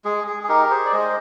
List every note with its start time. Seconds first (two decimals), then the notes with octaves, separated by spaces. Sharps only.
0.05 G#3 G#4
0.27 G#4
0.43 G#4
0.49 D#4 G4 A#4
0.71 G#4 C5
0.86 D5
0.92 G#3 C5 D#5